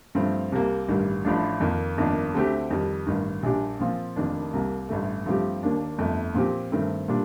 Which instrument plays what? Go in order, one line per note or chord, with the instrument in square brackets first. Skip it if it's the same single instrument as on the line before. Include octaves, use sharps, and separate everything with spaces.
[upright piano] G2 F3 A3 C4
C2 C3 G3 A#3
A1 G2 D#3 G3
A1 A2 F3 A3 D4
F2 D#3 A#3
G1 F2 D#3 A#3 D4
D2 D3 A3 C4 G4
F2 D#3 G3
A1 G2 D#3
A#1 A#2 G3 D4 G4
A#2 F3 C4 F4
F1 F2 D#3 A#3 D4
C2 C3 G3 A#3
A1 G2 D3 A3
G2 F3 A3 C4 G4
D#2 D#3 A#3 D4
G1 F2 D3 A3
A#2 F3 C4 G4
G2 D#3 A3 C4
A#2 G3 D4